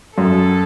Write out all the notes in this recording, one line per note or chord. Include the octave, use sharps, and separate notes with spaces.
F#2 A4